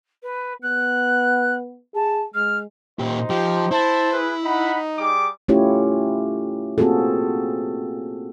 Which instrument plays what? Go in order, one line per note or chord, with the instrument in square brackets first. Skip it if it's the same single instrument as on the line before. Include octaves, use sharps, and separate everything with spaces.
[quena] B4
[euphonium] B3 [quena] F#6
[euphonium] G#4 [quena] A5
[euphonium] G#3 [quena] F6
[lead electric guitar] A#2 G4 [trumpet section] D#4 C5
[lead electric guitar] F3 [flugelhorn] G4
[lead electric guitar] E4 [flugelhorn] C5 [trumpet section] A5
[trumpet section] G#4 B4
[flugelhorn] D#4 [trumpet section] F#5 B5
[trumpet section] G3 G#4 D6
[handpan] A3 C#4 E4 F4 G4 C#5
A#3 C4 F4 F#4 G#4 A4